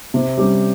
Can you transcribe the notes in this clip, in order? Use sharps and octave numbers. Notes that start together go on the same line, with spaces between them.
C3
G3 C#4 G4